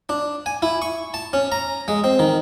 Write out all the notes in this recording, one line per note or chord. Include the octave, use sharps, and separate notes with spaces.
D4
G#5
E4
C#6
A5
C#4
A#5
G#3
C4
D#3